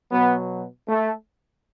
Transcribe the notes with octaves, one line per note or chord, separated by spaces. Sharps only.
B2 F#3 B3
A3